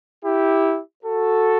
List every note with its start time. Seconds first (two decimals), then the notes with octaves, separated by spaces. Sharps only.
0.23 E4 G4
1.03 F#4 A4